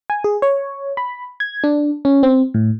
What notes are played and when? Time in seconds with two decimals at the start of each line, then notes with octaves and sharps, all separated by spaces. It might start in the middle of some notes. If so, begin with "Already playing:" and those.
0.10 G#5
0.24 G#4
0.42 C#5
0.97 B5
1.40 G#6
1.64 D4
2.05 C#4
2.23 C4
2.54 A2